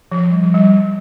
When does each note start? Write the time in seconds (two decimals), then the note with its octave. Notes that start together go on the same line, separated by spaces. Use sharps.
0.12 F3
0.31 G3
0.43 F3
0.54 G3